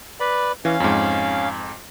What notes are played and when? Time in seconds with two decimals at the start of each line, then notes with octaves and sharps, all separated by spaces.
0.20 B4 D5 B5
0.65 E3 C#4 F5
0.80 F2 G#2